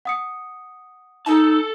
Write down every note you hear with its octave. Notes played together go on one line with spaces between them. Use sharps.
F#5 D#6 C#7
D#4 A4 A5